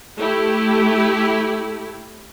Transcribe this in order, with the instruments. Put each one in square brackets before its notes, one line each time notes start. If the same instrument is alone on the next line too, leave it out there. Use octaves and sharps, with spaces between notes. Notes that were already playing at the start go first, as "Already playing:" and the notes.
[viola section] A3 E4 G4